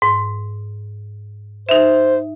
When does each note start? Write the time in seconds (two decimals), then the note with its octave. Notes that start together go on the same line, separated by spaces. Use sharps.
0.02 G#2
1.69 D#4 C5 E5